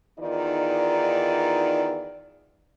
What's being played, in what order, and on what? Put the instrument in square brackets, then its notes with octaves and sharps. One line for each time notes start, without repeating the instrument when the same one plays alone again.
[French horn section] E2 D#3 D#4 F4 D5